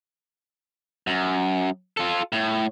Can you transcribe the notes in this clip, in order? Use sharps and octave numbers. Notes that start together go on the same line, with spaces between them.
F#2
F4 A4
A2